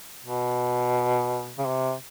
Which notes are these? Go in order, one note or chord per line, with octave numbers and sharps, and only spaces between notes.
B2
C#3
C3